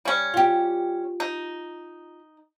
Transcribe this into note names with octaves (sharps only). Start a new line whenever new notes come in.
G3 C#4
F4 G4
D#4